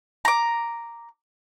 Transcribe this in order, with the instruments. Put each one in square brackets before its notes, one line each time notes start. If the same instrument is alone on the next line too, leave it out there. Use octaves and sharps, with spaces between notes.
[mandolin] A#5 D6